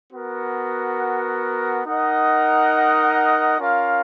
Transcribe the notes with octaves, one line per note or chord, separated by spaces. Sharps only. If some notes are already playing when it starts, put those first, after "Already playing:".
B3 F#4 A#4
D#4 A#4 D#5 F#5
C#4 F4 A#4 F5